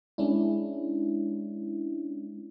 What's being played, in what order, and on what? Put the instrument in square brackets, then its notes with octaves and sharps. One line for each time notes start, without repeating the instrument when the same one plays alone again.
[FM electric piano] G#3 C#4 D4 E4